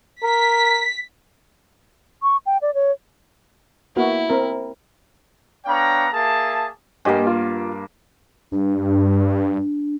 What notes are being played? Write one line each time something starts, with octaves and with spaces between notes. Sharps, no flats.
A#4 B6
C#6
G5
D5
C#5
A#3 B3 E4 F#4
C4 A#4
B3 D4 C#5 F5 G5 A#5
A#3 G#4 E5 A5
G2 A#3 G4 D#5 G#5
F4
G2 D4